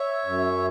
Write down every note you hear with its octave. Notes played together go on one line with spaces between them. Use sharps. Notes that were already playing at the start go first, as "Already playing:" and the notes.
Already playing: C#5 E5
F#2